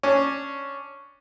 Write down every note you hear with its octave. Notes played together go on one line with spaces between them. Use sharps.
C#4 D4